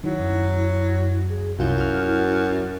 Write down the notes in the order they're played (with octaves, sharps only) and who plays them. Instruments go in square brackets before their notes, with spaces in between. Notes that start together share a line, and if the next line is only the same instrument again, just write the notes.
[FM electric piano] D#3 [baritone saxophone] F#3 [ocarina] E4
[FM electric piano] F#2
[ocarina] G#4
[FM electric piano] C2 F4 G6 [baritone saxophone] F#2 [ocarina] E4
[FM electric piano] F#4 F6